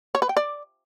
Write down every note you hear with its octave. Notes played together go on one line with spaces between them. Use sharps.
C#5
B4
G5
D5